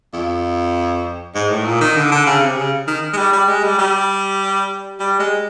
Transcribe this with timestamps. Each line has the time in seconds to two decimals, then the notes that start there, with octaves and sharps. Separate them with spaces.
0.14 F2
1.35 G#2
1.50 A2
1.66 A#2
1.81 D#3
1.97 D3
2.12 D3
2.26 C#3
2.42 C3
2.57 C#3
2.88 D#3
3.13 G#3
3.17 G3
3.33 G3
3.48 G#3
3.63 G3
3.78 G3
5.00 G3
5.19 G#3